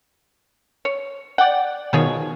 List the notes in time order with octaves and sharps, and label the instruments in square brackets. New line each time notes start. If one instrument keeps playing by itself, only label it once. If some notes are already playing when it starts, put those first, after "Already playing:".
[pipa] C#5
[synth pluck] D5 G5 [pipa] F#5
[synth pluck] B2 D#3 [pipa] F3 G#4 C#5